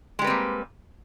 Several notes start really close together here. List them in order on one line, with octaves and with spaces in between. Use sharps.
G#3 G3 B4 C4 A#3